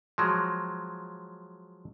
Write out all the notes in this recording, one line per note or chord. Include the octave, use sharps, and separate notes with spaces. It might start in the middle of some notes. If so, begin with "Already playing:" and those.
F3 F#3 G#3